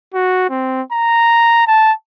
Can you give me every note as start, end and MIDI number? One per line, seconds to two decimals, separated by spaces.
0.14 0.49 66
0.50 0.82 60
0.92 1.64 82
1.67 1.92 81